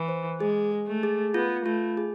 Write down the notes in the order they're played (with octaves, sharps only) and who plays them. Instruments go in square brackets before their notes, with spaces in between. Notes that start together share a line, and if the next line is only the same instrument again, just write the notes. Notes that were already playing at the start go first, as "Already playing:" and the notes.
Already playing: [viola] E3
[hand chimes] C5
[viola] G#3 [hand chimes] G#4
[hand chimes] G#4
[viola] A3
[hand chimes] G#4
[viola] B3 [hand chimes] F4
[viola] A3 [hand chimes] F4
[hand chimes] G#4